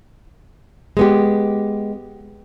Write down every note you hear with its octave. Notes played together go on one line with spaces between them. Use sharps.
G#3 B3 G4